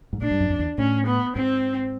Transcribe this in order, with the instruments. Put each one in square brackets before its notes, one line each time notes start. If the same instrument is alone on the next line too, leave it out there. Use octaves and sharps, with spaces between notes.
[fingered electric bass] G#2
[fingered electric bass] A2 [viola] D4
[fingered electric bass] G2
F#2
F2
E2
[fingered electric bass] A2 [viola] C#4
[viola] B3
[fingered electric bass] G#2 [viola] C4